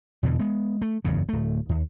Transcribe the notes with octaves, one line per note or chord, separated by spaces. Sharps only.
E2 G2 B2 D3
G#3 B3
A3
F#1 E2 G2 C#3
D1 A3
D#2